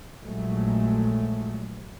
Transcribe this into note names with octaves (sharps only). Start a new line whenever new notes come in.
A#1 A#2 F#3 G#3 A3